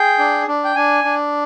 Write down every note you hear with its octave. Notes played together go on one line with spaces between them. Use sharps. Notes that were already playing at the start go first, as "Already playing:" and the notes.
Already playing: G#4 G5
D4
D4
G5
D4 G#5
D4